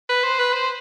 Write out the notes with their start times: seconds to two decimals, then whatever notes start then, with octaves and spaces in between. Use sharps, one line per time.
0.09 B4
0.24 C5
0.39 B4
0.54 C5